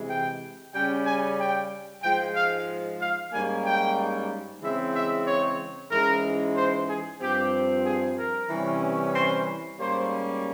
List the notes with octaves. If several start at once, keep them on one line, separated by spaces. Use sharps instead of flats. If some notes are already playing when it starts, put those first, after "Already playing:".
Already playing: C3 E3 G#3
G5
C#3 G3 C#4 G5
G#5
G5
G#2 F3 G#3 G5
F5
F5
G#2 G3 A#3 C#4 G#5
G5
C#3 E3 G#3 C4 E5
E5
C#5
G#2 E3 G#3 C#4 A#4
C5
G#4
G2 F3 C4 G4
G#4
A#4
C3 E3 G3 C#4
C5
G#2 G3 A#3 C#4 C5